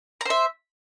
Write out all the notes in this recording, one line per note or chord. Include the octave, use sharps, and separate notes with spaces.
C5 E5 A#5